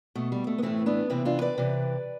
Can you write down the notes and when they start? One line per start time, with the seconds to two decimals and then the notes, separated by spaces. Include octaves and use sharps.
0.15 B2 A3
0.32 G3
0.47 A3
0.58 B3
0.62 A2 E3 A3 C4
0.86 B3 D4
1.10 C3 E3 C4 E4
1.25 D4 F4
1.41 B4 D5
1.58 C3 E3